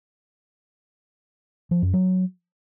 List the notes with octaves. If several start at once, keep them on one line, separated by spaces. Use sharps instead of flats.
F3
F#2
F#3